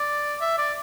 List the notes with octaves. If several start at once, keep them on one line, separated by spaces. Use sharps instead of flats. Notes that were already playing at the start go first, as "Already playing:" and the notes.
Already playing: D5
E5
D5